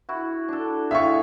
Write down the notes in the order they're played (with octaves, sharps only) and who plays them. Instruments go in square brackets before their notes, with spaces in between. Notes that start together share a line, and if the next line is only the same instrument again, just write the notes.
[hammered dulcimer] E4 F#4
D4 A4
[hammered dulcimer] A2 F4 G#4 [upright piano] E5 F5 C#6